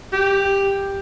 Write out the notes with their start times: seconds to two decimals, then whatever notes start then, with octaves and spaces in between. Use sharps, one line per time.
0.13 G4